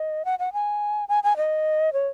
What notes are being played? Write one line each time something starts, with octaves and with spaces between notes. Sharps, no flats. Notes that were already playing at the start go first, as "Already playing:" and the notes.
Already playing: D#5
F#5
F#5
G#5
G#5
G#5
D#5
C#5